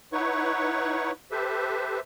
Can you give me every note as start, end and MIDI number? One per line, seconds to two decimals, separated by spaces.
0.13 1.11 63
0.13 1.11 64
0.13 1.11 71
0.13 1.11 73
0.13 1.11 78
0.13 1.11 85
1.31 2.00 67
1.31 2.00 69
1.31 2.00 71
1.31 2.00 72
1.31 2.00 76